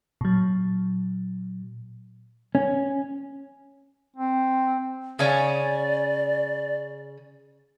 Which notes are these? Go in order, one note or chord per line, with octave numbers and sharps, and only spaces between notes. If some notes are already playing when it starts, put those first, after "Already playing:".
A#2 F#3
C#4
C4
C#3 C#4 D5